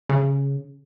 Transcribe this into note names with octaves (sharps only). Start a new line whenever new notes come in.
C#3